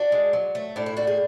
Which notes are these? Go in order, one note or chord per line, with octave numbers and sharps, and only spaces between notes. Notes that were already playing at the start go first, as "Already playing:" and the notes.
Already playing: D4 F#4
G#3
F#3
A3
A2 D4
E4
D4 F#4
G#4